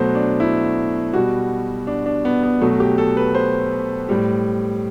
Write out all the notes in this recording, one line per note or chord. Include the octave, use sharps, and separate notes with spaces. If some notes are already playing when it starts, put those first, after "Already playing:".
Already playing: B2 F#3 A3 C5
D4
E4
B2 G3 F#4
D4
D4
B3
B3
B2 F#3 A3
G4
A4
B4
C5
A2 G3